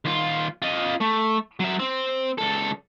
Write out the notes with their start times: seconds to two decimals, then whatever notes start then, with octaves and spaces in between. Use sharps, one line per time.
0.05 D#2 F4
0.62 F4 D#5
1.01 A3
1.60 F#3 E5
1.80 C4
2.38 C#2 A4